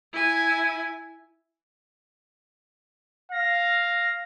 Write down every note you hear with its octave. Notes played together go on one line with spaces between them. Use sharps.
E4 G#5
F5 A#6